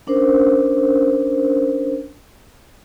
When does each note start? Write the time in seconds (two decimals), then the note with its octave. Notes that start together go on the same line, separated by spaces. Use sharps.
0.07 C#4 D4 A#4 C5